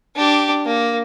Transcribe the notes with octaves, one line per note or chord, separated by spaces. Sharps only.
D4 G4
A#3